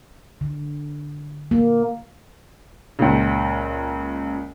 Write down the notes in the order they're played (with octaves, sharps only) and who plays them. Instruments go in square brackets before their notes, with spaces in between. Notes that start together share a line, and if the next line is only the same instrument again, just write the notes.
[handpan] D3
A#3
[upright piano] C#2 A#2 C#3